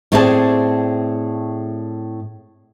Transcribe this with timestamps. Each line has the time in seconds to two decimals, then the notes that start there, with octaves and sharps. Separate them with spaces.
0.12 A2 A3 C4 G#4 D5 A5